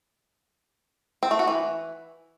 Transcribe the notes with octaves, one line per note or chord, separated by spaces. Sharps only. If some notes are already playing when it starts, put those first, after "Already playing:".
C4
A3
F#4
E3